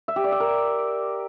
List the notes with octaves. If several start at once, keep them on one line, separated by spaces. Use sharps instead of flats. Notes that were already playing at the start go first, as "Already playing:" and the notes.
E5
G4
D5
E5
A#4